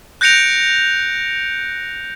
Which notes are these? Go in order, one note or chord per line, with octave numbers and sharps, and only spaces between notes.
F#6 G6 A#6 C#7 D7 F7